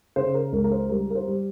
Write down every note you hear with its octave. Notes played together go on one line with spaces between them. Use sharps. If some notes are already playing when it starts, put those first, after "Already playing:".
C#3 C5
A#4
C#2 A#4
A#4
C5
G3 A#4
A#4
C5
G3